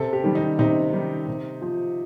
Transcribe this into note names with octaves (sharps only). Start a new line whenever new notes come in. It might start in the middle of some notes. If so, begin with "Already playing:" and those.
Already playing: C3 A4
G4
D#3 G3
D#4
C3 D#4
D#3 G3
C3
F3